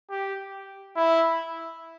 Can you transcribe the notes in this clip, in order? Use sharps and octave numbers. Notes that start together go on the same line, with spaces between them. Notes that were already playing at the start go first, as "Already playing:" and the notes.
G4
E4